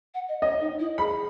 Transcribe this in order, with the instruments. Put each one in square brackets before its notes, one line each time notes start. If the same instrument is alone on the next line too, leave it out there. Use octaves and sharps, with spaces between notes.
[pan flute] F#5
D#5
[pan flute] C#5 [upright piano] D#5
[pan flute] D#4
E4
[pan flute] G#4 [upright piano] B5